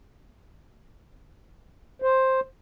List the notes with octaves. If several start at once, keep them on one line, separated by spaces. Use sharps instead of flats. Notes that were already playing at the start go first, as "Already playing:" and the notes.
C5